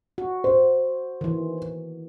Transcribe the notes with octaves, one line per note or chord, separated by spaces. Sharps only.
F#4
C5
D#3 E3